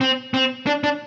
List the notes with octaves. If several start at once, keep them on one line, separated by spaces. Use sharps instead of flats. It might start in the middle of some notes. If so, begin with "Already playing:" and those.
C4
C4
D4
D4